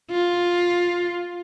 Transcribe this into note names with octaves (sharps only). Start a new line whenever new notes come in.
F4